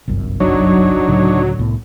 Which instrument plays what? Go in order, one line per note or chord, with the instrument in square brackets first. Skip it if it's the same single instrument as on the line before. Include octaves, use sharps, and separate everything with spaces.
[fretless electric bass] G1 C2 F#2
[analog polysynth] F#3 [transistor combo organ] D4 D#4 C#5
[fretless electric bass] C#2 A2 D3
C2 A2 B3